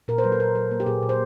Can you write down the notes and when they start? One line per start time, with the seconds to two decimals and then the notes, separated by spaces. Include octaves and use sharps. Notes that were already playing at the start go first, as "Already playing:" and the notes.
0.08 A#2 A#4
0.18 C5
0.24 F#3 B4
0.32 A4
0.40 A#2 A#4
0.55 F#3 A4
0.71 A#3
0.80 G4
0.86 A#2 G#4
1.03 A#2
1.09 C5